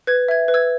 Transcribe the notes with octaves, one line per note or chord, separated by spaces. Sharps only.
B4 G#6
E5 G#6
B4
E6 G#6